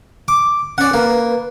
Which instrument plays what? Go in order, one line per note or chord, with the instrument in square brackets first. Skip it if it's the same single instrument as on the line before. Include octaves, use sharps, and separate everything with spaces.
[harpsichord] D6
[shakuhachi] C#4 [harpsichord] D5 F#5
[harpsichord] A#3 [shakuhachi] B4